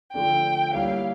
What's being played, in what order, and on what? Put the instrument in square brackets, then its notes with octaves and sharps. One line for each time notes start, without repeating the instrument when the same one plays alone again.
[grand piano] D3 F3 A3 D4 [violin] G5
[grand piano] G3 A#3 E4 G4 C#5 [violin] F5